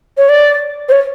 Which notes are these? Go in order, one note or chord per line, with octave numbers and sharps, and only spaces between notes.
C#5
D5
C5
C#5